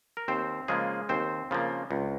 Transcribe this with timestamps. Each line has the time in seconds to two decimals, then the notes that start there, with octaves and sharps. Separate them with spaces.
0.17 A#4
0.28 D#2 C4 C5
0.68 C#3 F3 G#3 A#3 G#4
1.09 D#2 C4 C5
1.51 C#3 F3 A#3
1.91 C#2